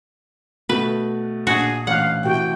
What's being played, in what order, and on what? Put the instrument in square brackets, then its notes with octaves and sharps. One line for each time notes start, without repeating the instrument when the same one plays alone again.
[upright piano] B2 A3 [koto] B4
[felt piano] A#1 D4 G#6 [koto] F#4 [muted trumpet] G#4
[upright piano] A1 F#6 [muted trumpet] F5 [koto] F#5
[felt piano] C3 E3 F#4 [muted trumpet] G5